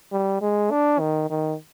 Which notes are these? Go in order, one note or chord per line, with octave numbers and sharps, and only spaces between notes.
G3
G#3
D4
D#3
D#3